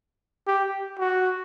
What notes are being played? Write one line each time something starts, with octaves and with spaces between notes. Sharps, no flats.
G4
F#4